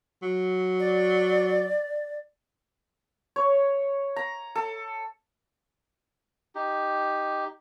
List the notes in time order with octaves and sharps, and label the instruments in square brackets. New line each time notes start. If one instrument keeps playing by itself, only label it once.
[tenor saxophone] F#3
[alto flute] D5
[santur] C#5
A#5
A4
[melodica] D#4 G4